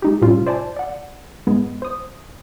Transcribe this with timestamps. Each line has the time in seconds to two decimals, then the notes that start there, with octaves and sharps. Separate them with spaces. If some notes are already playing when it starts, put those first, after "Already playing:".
0.02 G#3 D#4 G4
0.22 A2 C3 G3 C#4 F4
0.46 C5 D5 G#5 A5
0.77 D5 F#5
1.47 G#2 G#3 B3
1.82 C5 D#6